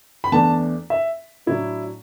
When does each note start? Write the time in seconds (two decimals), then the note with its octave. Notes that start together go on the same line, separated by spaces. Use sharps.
0.24 B5
0.32 E2 E3 A3 D4 A5
0.90 E5
1.46 A2 F#3 D4 E4